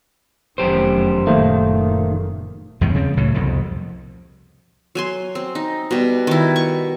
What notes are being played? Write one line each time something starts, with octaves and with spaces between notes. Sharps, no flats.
F1 F#2 D#3 G4 C5
F#1 A#2 D#3 A3 A#3 C5
E2 G#2 B2 D#3
C#3 F3 C4
C#2 A2 F#3
C2 F2 B2
F#3 G#5 C6
C4
D#4
B2 G3
D#3 E4
C#6